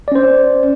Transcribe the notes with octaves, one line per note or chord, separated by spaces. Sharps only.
C#4 C5 D5